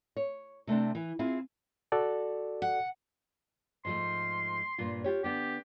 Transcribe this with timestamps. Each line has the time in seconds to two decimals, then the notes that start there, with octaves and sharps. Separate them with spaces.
0.16 C#5
0.67 C3 A3 C4 D4
0.95 E3
1.19 C4 E4 F4 G#4
1.92 F#4 A4 D5
2.62 F#5
3.85 G#2 F3 A3 C6
4.78 G2 A#2 F4
5.04 F4 G4 C#5
5.24 D3 B3 D4 G4